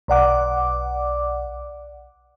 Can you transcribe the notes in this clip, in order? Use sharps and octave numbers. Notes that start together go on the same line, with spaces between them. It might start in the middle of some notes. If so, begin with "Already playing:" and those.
B1 D5 F#5 D6